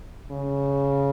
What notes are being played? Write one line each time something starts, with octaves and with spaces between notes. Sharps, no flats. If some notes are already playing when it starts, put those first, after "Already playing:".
C#3